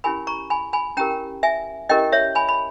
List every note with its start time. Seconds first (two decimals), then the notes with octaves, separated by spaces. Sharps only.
0.04 C#4 E4 G4 A#4 G#5 B5
0.27 A#5 C#6
0.50 G#5 B5
0.73 G#5 B5
0.97 C#4 E4 G4 A#4 G5 A#5
1.43 E5 G#5
1.89 C#4 E4 G4 A#4 D#5 G5
2.12 C#5 E5
2.35 G#5 B5
2.49 B5